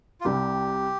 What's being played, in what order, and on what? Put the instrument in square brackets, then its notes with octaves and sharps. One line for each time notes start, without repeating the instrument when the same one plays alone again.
[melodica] F4
[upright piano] C2 C3 G3 [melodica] G4